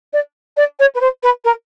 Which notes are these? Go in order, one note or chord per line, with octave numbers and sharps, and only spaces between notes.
D5
D5
C#5
B4
C5
B4
A#4